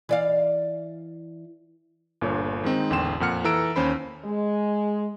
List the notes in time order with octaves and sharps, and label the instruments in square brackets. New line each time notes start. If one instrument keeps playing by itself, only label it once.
[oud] E3 D5 F5
[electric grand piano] G1 A#2 D3 C#5
D#3 G#3 C4 D#4
A1 E2 D3 G5 C6 E7
F2 A#2 F#5 F6 C#7
E3 A4 A#5 E6 D7
D#2 C#4 C5 B5
[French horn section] G#3